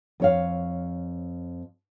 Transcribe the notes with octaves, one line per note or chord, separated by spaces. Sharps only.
F2 C#5 F5